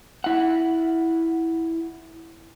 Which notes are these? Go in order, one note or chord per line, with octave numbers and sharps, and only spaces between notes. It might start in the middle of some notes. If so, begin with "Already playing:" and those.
E4 F#5